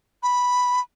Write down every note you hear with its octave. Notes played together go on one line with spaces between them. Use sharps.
B5